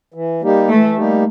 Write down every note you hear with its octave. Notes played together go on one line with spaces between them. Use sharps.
E3
G3 A#3 D#4 G4
E3 A3
G3 A#3 D#4 G4